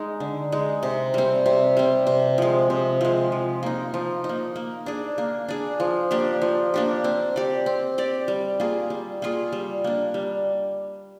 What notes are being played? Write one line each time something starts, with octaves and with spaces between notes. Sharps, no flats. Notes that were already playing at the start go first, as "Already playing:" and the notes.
Already playing: G#3 D#4
D3
G#3 D#4
C3
G3 C4
C3
G3 C4
C3
F3 G#3
C3
F3 G#3
F3
A#3 D#4
F3
D#4
A#3
A#3
D4 G#4
A#3
D4 G#4
F3
A#3 D4 G4
F3
A#3 D4 G4
C4
G4 D5
C4
G4 D5
G3
A#3 F4 G#4
G3
A#3 F4 G#4
G3
A#3 D4
G3